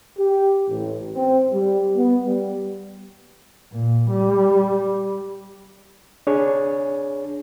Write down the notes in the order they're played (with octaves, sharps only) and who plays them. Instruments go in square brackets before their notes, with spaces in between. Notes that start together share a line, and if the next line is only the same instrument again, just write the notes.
[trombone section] G4
A1
C4
G3
B3
G3
[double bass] A#2
G3
[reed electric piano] D4 G#4 C#5